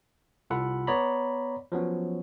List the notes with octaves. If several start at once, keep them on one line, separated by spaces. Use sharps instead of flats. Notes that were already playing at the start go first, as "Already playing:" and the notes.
C2 F4 A4 F#5 B5
B3 C#5 D5 A#5 B5
F3 F#3 B3 C#4